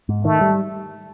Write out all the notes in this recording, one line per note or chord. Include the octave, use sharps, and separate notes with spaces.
G#2
D#3 A3
G3